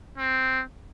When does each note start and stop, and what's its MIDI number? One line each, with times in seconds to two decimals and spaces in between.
0.18 0.62 60